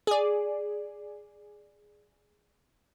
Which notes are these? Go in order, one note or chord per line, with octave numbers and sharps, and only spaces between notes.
G#4 D5